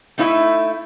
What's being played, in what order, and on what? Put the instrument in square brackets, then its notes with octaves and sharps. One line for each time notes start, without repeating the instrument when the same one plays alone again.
[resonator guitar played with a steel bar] A3 D#4 E4 B4 E5